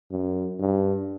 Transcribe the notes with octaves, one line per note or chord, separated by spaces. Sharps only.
F#2
G2